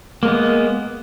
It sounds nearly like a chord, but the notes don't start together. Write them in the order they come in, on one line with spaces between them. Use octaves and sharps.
A#3 G#3 B3